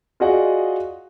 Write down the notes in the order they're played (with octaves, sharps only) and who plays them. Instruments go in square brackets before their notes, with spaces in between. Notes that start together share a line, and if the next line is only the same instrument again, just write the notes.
[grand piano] F4 F#4 G#4 D5 D#5 F#5